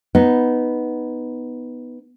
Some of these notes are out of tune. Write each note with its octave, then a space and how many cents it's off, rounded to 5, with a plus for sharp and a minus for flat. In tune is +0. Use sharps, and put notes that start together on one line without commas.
B3 +0 D#4 +0